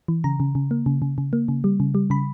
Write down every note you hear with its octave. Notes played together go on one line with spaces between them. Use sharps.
E3
C#3 A#5
C#3
C#3
A#3
C#3
C#3
C#3
A#3
C#3
G3
C#3
G3
C#3 B5